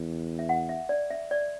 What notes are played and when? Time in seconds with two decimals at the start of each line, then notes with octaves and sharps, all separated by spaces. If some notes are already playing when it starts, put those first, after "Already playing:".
Already playing: E2
0.39 E5
0.49 F#5
0.69 E5
0.89 D5
1.10 E5
1.31 D5